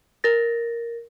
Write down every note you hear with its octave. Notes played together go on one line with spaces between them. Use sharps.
A#4 A6 A#6